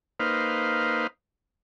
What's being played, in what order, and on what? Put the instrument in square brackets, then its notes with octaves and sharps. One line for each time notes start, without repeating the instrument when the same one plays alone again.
[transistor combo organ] A#3 D#4 B4 C5 F5